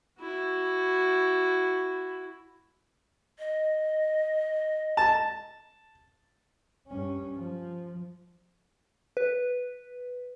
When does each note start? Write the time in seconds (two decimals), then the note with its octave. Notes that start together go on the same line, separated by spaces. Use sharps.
0.21 E4 F#4
3.39 D#5
4.97 A5
6.88 G2 C#4
7.36 F3
9.17 B4